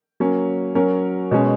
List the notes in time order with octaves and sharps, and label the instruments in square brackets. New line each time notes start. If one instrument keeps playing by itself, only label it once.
[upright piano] F#3 A#3 C#4
F#3 C#4 F#4 A#4
B2 G#3 C#4